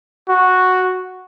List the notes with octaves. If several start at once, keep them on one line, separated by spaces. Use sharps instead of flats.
F#4